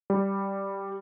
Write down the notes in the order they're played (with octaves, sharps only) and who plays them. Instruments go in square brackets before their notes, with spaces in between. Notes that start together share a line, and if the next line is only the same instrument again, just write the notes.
[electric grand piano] G3